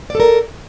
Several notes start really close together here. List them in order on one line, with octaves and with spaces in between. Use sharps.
D5 A4 A#4